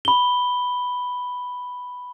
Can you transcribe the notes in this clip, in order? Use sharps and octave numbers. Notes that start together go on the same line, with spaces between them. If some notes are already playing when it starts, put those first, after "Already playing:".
B5 G7